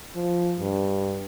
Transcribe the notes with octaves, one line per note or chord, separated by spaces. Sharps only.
F3
G2